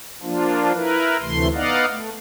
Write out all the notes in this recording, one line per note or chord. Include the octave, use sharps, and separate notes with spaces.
F3 A#3 D4 F4
E4 A#4 B4
D2 C3 E3 A3 C6
B3 D#4 D5 D#5 F5 F#5
A3